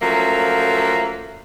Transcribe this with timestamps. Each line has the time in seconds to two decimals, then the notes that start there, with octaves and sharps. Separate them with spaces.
0.01 F3 F#3 A3 A#3 C#4 E5